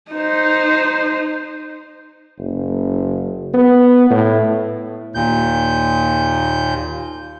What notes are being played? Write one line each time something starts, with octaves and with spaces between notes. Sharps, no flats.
D#4 C5
F#1
B3
A2
D#2 A#2 G6